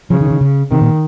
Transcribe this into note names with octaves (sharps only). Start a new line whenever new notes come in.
C#3 F3
D#3
D#3
C#3
C3 D#3
A#2